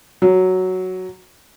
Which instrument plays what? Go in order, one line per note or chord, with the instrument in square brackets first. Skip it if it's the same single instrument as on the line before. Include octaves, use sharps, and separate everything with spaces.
[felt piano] F#3